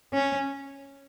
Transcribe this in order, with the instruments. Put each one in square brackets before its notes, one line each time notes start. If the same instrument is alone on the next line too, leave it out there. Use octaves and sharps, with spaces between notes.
[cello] C#4